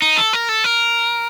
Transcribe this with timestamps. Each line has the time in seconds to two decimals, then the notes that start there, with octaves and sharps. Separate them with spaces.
0.02 D#4
0.17 A4
0.33 A#4
0.49 A4
0.64 A#4